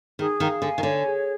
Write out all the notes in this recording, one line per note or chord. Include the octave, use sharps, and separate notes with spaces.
D#3 G#4
D#3 F5
D3 G#5
D#3
D3 C#5
G#4